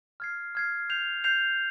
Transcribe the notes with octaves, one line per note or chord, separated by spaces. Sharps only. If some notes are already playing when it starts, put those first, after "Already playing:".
F6 G#6 C7
F6 G#6 C7
G6 C7 F7
G6 C7 F7